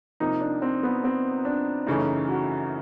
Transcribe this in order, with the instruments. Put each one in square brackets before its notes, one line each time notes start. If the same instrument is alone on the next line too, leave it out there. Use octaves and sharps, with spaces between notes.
[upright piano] C3 F3 A#3 [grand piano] D#4
[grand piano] D4
C4
B3
C4
D4
[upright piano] F#2 C#3 E3 A3 C#4 [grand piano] D#4
[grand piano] F#4